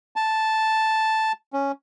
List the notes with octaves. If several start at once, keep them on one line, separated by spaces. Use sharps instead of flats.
A5
C#4